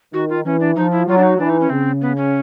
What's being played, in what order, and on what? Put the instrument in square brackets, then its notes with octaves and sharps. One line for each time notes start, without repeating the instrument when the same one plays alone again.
[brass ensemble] D#3 [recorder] F#4
[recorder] F4
[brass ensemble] E3 [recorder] C#4
[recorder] D4
[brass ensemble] F3 [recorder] D#4
[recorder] E4
[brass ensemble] F#3 [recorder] F4
[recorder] D4
D#4
[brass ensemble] E3 [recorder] D4
[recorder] D#4
C#4
[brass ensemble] C#3 [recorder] C4
[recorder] B3
C#4